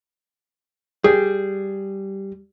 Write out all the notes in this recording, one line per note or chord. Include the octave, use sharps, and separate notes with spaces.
G3 G#4